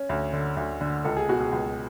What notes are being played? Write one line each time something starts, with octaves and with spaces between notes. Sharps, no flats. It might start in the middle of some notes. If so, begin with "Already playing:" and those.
Already playing: C#4
D2
D3
D2
D3
C#2 A4
G#4
B2 F#4
G#4
C#2